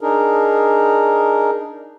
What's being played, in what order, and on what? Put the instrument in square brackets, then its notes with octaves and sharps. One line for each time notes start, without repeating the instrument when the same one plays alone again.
[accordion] D4 D#4 G#4 A#4